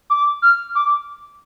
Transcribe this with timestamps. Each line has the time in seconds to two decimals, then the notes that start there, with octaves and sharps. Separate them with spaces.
0.10 D6
0.42 F6
0.75 D6